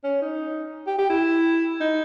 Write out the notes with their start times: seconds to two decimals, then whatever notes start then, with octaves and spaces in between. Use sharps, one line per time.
0.04 C#4
0.22 D#4
0.87 G4
0.99 G4
1.10 E4
1.81 D#4